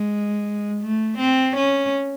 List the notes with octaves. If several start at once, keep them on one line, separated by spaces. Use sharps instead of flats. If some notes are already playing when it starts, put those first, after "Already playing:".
Already playing: G#3
A3
C4
C#4